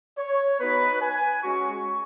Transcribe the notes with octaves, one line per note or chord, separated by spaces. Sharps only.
C#5
B3 D#4 F#4 B4
G#5
G#3 C#4 F#4 C#6